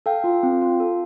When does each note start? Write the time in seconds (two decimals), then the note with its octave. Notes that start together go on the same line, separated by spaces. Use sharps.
0.06 A4 F5 G5
0.24 F4
0.43 C4
0.62 F4
0.80 A4